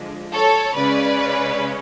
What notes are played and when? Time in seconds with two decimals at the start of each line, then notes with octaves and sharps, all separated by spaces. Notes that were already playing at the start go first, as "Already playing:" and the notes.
Already playing: D3 F3 G#3 D4
0.32 A4 C#5
0.75 C#3 G#3 C#4 B4 D5